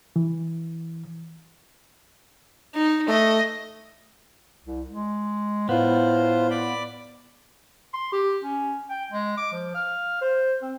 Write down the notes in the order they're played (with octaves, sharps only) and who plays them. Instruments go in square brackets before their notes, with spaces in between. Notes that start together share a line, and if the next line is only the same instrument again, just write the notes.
[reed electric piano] E3
[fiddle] D#4
[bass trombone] A3 [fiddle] D#5
[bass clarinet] C2
G#3
[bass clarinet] A2 [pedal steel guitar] B3 [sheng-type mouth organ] F4 C5
[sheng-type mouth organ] D5 B5
[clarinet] C6
G4
C#4
G5
G#3
D6
F3
F5
C5
C4